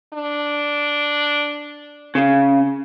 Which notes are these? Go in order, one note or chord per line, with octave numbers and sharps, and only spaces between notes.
D4
C#3